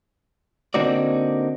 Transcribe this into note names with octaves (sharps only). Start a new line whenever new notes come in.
D3 A#3 C4 D#4 F#4 D5